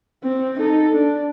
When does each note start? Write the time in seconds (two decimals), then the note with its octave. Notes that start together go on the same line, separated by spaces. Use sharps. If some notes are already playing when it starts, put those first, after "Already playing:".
0.24 C4
0.59 D#4 A4
0.94 D4